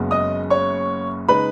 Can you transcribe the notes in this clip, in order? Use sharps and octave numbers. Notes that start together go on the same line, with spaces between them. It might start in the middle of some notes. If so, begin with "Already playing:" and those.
Already playing: F#1 F#2 C#3 G#3 B3
D#5 D#6
C#5 C#6
C#3 G#3 D#4 B4 B5